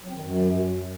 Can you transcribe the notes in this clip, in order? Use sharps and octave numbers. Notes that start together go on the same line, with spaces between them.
F#3
C4
D#3
F#2